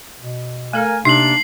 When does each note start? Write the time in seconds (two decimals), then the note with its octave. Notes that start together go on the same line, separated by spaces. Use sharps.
0.21 B2
0.73 A3 A4 A#4 F5 G#5
1.05 C3 A#3 D4 D#4 C7 F#7